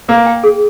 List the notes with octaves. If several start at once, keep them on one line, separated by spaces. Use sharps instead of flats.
A#3 A#4
G5
G#4